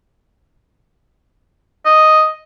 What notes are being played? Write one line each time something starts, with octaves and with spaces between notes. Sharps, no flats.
D#5